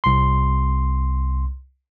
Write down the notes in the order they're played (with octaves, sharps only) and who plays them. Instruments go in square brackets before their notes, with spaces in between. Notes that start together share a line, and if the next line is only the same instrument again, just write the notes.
[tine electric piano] C2 C6